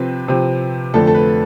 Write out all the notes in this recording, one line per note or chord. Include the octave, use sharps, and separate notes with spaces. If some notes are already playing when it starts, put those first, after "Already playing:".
Already playing: C3 F3 C4 B4
C3 F3 C4
F2 D3 A3 A4
A4
B4